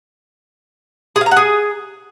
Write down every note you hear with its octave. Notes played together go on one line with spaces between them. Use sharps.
G#4
F5
A#5
F#5
G#4